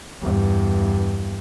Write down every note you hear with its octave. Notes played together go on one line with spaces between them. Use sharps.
E2 G2